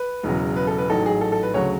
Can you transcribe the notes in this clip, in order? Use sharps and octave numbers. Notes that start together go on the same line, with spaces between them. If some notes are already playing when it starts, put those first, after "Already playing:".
Already playing: B4
E1 E2 C#3 F#3
B4
A4
B4
A1 G#2 F#3 A4
G#4
A4
A4
B4
D2 C#3 F#3 C#5